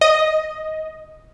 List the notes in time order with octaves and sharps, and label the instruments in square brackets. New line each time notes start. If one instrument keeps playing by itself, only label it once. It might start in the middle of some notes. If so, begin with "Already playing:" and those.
[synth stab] D#5